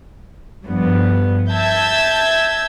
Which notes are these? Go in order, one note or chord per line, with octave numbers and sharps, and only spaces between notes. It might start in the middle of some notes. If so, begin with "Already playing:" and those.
G2 F3 B3
E5 A5 E6 G6 G#6